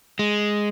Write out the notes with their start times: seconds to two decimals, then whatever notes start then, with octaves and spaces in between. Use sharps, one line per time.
0.19 G#3